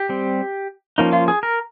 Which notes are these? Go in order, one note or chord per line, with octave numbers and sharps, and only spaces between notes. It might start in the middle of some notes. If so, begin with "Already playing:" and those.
Already playing: G4
G3 C4
F3 A#3 C#4 D#4
F4
G#4
A#4